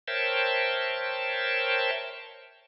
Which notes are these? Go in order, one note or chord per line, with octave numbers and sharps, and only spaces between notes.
A#4 C5 C#5 E5 G5 A5